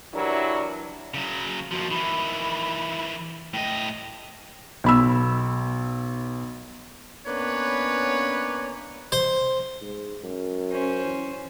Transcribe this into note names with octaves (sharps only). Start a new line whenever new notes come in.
E3 F#3 D4 E4 G4 A#4
C#3 F#3
D#2 F3 F#4
D#3 E3 B5
A2 D#5 G5
B1 B5 E6
A#3 B3 C#4 D4 B4 C#5
C5
G#2
F#2
C#4 C5
E3